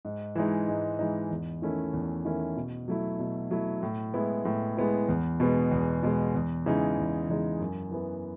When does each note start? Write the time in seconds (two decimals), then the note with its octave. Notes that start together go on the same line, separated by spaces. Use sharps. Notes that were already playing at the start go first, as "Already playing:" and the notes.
0.05 G#2
0.35 E3 G#3 D#4
0.68 G#2
0.99 E3 G#3 D#4
1.31 E2
1.62 D#3 A3 C#4 E4
1.93 E2
2.25 D#3 A3 C#4 E4
2.57 B2
2.88 F#3 A3 E4
3.19 B2
3.51 F#3 A3 E4
3.83 A2
4.14 G#3 B3 E4
4.45 A2
4.77 G#3 B3 E4
5.08 E2
5.40 B2 G#3 B3
5.71 E2
6.03 B2 G#3 B3
6.34 E2
6.66 C#3 E3 G#3 D#4
6.97 E2
7.29 C#3 E3 G#3 D#4
7.60 F#2
7.91 E3 B3